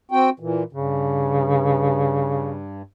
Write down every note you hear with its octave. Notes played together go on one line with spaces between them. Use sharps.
C4 F#4 G5
A#2 E3
G2 C#3